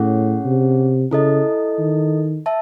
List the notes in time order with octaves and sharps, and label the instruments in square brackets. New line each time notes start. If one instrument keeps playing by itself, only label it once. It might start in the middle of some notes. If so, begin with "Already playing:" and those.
Already playing: [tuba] A2 [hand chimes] C#4 G#4 C#5 F#5
[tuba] C3
[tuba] C#3 [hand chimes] E4 A4 D#5
[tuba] D#3
[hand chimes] E5 A5